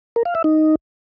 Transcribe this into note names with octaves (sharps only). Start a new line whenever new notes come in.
A#4
F5
E5
D#4